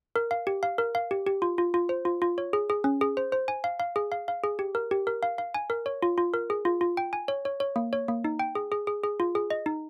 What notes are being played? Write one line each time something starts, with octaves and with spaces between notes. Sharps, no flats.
A#4
F5
G4
F5
A#4
F5
G4
G4
F4
F4
F4
C5
F4
F4
C#5
G#4
G#4
C#4
G#4
C5
C5
G#5
F5
F5
G#4
F5
F5
G#4
G4
A#4
G4
A#4
F5
F5
G#5
A#4
C#5
F4
F4
A#4
G#4
F4
F4
G5
G#5
C#5
C#5
C#5
A#3
C#5
A#3
D#4
G5
G#4
G#4
G#4
G#4
F4
G#4
D#5
D#4